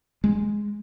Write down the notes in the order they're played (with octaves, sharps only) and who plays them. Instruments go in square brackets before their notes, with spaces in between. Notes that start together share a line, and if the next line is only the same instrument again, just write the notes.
[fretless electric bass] G#3